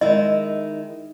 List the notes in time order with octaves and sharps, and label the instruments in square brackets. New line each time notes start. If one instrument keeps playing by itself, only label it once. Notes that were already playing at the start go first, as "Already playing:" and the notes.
[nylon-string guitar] D#3 G#3 E4 [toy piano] D#5